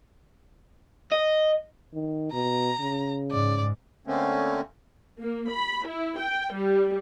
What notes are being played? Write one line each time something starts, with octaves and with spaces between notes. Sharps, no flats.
D#5
D#3
B2 A#5
C#3
G#2 D5
D3 A3 A#3 C4 C#4
A#3
B5
E4
G5
G3